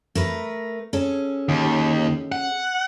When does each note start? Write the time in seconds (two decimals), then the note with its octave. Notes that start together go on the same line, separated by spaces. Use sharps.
0.15 A3 A#4 B4
0.93 C#4 G#4 A4
1.49 D#2
2.32 F#5